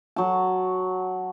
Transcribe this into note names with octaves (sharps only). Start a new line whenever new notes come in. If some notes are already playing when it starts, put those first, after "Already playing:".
F#3 A5